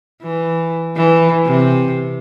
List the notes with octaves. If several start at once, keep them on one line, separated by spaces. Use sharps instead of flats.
E3
E3
C3